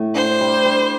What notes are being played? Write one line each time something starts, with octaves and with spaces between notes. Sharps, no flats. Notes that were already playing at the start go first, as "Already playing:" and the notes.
Already playing: A2
D4 C5
G3
G3